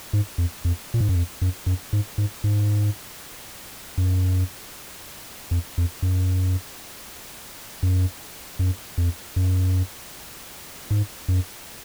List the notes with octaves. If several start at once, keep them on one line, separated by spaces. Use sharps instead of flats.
G#2
F2
F2
A#2
G#2
F#2
F2
F#2
F#2
G#2
G#2
G#2
F#2
F2
F2
F#2
F#2
F#2
F2
F#2
G#2
F#2